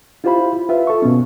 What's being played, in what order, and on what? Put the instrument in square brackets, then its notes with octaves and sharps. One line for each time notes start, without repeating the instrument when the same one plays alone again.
[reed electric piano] E4 F4 G4 C5 F5 B5
F4 B4 E5 F5
A4 C#6
B2 B3 C#4